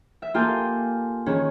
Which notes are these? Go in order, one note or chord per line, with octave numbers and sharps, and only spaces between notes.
E5
A#3 F4 G4 A4 G#5
D#3 C#4 G#4